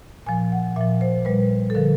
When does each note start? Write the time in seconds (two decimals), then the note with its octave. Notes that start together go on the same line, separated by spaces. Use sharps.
0.26 A#2 F3 G#5
0.52 F#5
0.76 A#2 F3 E5
1.01 C5
1.25 A#2 G3 B4
1.70 A4
1.75 D3 F3 A#4